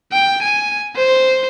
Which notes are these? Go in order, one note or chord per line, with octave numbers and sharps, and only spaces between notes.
G5
G#5
C5